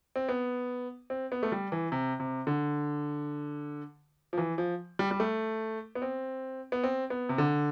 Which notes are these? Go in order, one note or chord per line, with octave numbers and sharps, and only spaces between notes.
C4
B3
C4
B3
A3
G3
E3
C3
C3
D3
F3
E3
F3
G3
G3
A3
B3
C4
B3
C4
B3
C3
D3